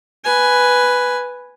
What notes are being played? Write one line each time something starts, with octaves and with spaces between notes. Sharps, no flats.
B4 G#5